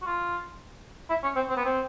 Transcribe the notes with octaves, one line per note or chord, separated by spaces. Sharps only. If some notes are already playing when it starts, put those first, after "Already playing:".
F#4
F4
E4
C#4
C4
C4
B3
C4